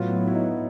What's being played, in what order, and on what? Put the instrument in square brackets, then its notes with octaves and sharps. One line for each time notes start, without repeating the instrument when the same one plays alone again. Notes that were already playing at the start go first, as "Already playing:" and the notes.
Already playing: [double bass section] A2 F#3 B3 [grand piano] F4
[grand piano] E4
E4
D#4